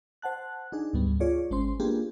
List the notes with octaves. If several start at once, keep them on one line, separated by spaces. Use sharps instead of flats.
C5 F#5 A5 F#6
D4 D#4 G#4
D2 G#2 G3 B3
F4 G#4 C#5 D5
G#1 G#3 C#4 C5 C6
A#3 B3 D4 F4 G4 G#4